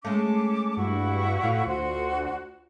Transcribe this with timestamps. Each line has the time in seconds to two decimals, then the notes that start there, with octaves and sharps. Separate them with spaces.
0.05 G#3 A3 C#4 A5 D6
0.77 G2 E4 F#4 C#6
1.44 A2 F4
1.67 D2 F#4 C5 F#5